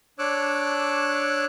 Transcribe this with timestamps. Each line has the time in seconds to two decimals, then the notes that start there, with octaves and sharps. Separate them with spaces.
0.19 D4 C#5 D6 E6 F#6